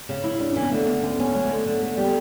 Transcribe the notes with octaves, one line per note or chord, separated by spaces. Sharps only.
C#3
E4
C#3 D4
C#4
E3
B3
D3 A3
D2 B3
D2 C#4
B3 C#4
F#3 A3
A3
D3
B3
D3
A3
G3 B3